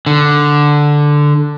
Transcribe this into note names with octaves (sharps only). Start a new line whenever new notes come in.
D3